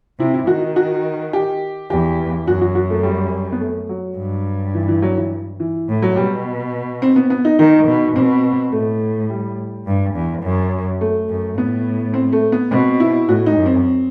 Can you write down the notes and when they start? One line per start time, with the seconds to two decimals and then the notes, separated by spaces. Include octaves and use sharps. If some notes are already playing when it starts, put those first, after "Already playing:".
0.19 C3 E4
0.34 E4
0.47 D#3 F#4
0.76 F#4
1.33 G4
1.90 E2 G4
2.47 F#2 F#4
2.61 F#4
2.75 F#4
2.90 A3
3.03 G3
3.52 B3
3.60 A3
3.89 F#3
4.17 G2
4.75 E3
4.88 E3
5.02 F#3
5.17 E3
5.60 E3
5.89 A2
6.02 F#3
6.16 B2 G3
7.02 C4
7.16 B3
7.30 B3
7.45 D#4
7.59 D#3 D#4
7.88 B2
8.16 B2 C4
8.72 A2 A3
9.30 G3
9.86 G2
10.14 E2
10.43 F#2
11.01 A3
11.29 F#2
11.58 A2 B3
12.14 C4
12.33 A3
12.52 B3
12.71 B2 C4
13.00 E4
13.28 A2 F#4
13.46 D#4
13.56 F#2
13.66 C4